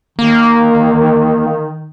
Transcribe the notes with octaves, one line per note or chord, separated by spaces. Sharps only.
D#3 A#3